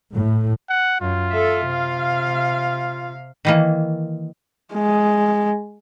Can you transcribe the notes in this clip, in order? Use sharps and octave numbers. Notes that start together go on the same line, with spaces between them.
A2
F#5
F#2 F4
A4 E5
C3 F5
D#3 E3 A#3
G#3